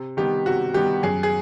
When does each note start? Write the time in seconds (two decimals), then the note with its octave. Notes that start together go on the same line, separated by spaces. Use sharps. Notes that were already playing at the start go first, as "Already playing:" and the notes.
Already playing: C3
0.17 D#3 G3 B3 G4
0.46 C3 F#4
0.74 D#3 G3 B3 G4
1.03 F#2 G#4
1.23 G#4